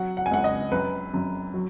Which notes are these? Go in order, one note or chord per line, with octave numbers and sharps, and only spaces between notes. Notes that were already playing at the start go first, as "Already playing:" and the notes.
Already playing: F#3 F#5
F#5
G#5
C#2 F#5
D#5
F#2 B4
F#2
F#3